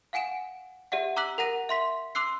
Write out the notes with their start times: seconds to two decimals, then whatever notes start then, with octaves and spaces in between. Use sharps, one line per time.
0.13 F5 F#5 G#5 D7 E7
0.92 G4 D5 E5 F#5
1.16 A#5 D6 E6 F#6 B6 F#7
1.38 A#4 F#5 A#5 A#6 D#7
1.69 E5 C6 B6
2.15 C6 D6 E6 F#6 C7